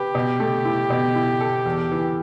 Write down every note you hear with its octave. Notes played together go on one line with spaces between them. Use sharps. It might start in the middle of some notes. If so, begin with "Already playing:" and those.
Already playing: G4 B4
B2
A3
E4
B2
E4
A4
E2
E3